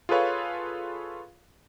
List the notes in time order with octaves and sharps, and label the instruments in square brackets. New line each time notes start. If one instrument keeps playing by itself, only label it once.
[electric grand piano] F4 G#4 A4 B4 C#5 F5